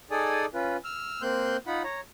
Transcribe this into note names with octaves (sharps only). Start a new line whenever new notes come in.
D#4 G#4 A4 D5 G#5 D#6
C#4 F4 B4
E6 F6
A#3 C4 C6 F#6 G6
D#4 F4 F#5 B5
C#5 A#5